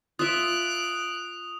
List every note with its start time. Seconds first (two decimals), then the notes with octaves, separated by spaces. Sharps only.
0.19 F4 E5 D#6 F#6 D7